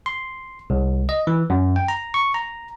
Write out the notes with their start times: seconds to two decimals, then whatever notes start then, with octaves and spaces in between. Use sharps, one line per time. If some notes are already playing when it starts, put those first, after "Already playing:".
0.06 C6
0.70 C2
1.09 D#5
1.27 E3
1.50 F#2
1.76 G5
1.88 A#5
2.14 C#6
2.34 A#5